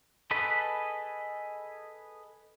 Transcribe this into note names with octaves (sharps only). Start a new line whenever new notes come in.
G#4 A4 B4 D#5 B5